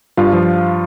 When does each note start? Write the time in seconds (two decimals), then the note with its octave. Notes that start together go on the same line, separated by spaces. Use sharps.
0.17 G2 F4 F5
0.33 F3